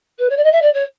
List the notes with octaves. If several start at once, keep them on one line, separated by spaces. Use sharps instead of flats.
B4
C#5
D5
D#5
E5
D5
C#5